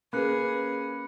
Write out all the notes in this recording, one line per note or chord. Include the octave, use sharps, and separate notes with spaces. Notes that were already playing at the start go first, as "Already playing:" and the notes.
A#3 C#4 G#4 B4 B5 F#6 C#7